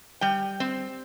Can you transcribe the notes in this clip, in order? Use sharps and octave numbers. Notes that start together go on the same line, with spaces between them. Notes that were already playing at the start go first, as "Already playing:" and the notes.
G3 G5
C4